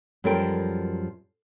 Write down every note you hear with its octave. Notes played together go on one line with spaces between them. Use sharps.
F#2 F3 G3 A4 A#4 G5